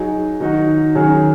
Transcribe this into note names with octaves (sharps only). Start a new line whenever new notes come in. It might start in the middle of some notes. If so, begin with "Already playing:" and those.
Already playing: F#3 D#4 G#4
D#3 F#3 D#4 F#4
D#3 F#3 C#4 G#4